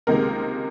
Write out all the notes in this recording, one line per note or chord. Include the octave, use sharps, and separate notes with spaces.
C#2 C3 D#3 G#3 A#3 A#4